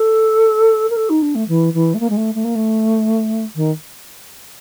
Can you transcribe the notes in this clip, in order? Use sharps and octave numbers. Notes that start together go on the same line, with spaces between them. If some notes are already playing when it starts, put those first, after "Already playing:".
Already playing: A4
A#4
A4
D#4
D4
A3
E3
E3
A3
A#3
G#3
A3
A3
A#3
A3
D#3